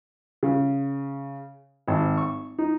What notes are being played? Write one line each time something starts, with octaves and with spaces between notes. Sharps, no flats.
C#3
G#1
C#6
D#4